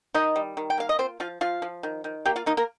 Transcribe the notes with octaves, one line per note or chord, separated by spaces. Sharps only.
D#3 D#4 D#5
G3
D#3
G5
A#3 F5
D#5
C4 F4 C5
F3 F4 F5
F3 F4 F5
F3
D#3
D#3
A#3 G4 G5
F4 F5
A#3 D#4 D#5
A#3 A#4